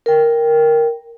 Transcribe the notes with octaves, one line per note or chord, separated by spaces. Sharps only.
A#4 G5